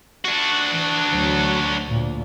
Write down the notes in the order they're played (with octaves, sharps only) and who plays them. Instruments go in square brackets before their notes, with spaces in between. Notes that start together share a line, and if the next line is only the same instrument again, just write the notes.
[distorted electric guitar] D4 F#4
[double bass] E3
D2 F#3
D2 A#2